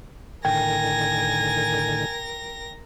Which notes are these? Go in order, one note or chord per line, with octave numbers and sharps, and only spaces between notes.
A2 D3 D#3 A#4 G5 G#5 G#6 A#6